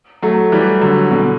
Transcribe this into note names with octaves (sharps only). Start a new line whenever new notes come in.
F#3 A3
E3 G3
D3 F#3
B2 D3